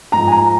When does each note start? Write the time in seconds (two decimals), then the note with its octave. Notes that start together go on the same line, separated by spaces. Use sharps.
0.12 G#2 F3 A#5
0.27 G#5
0.32 A#5